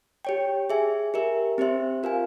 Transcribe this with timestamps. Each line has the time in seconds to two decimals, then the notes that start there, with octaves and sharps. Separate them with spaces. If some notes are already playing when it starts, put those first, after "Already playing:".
0.25 G4 C#5 G5
0.70 G#4 E5 G#5
1.14 G4 A#4 E5
1.58 C4 G4 C5 E5
2.03 F4 A#4 F5 G#5